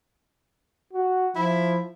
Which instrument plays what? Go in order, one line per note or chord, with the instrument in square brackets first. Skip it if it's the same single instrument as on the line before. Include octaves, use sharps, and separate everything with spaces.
[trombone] F#4
[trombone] F3 [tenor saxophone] E4